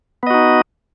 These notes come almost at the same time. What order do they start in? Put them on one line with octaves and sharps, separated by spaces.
B3 D#5 F#4 D#4